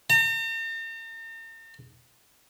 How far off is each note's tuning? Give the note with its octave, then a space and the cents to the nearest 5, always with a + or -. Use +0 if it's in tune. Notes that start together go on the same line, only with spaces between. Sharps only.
A#5 -45